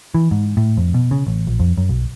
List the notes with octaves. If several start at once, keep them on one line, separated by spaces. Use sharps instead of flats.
E3
G#2
A2
F2
B2
C#3
A1
A#1
F2
F#2
B1